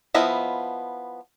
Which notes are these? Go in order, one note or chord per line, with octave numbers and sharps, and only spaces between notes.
F3 B3 E4 D#5